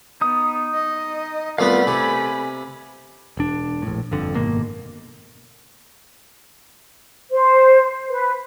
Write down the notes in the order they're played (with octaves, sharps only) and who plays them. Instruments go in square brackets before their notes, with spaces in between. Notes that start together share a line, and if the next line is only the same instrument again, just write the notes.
[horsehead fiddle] B3 [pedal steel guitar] D#4 D#6
[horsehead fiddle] D#5
[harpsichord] C2 B3 [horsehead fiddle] A3 B5 [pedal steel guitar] F4 F5
[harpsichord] C3 [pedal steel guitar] G#5
[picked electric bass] E1 D4
A#1 A2
G1 F2 D3
G#1 F#2 B2 A#3
[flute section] C5
B4